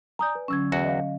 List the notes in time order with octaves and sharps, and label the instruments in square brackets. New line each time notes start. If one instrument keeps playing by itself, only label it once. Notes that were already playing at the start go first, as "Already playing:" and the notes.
[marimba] D5 G#5 [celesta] A#5 D#6 G6
[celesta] B4
[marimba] D3 F#3 C#4 [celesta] C#6 E6 G#6
[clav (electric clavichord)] E2 F#4
[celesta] D#5 F5